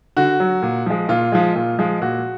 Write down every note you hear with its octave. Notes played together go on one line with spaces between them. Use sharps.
D3 F#4
F#3
A#2
F3 G#3
A#2 F4
F3 G#3
A#2
F3 G#3
A#2 F#4